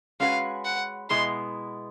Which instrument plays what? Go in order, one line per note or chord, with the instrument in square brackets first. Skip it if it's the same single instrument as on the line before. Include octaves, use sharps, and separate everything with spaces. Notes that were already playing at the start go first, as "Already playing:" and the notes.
[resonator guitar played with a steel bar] G#3 C#4 F#4 B4 [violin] F5
[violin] F#5
[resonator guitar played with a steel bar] B2 G#3 B3 E4 [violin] C6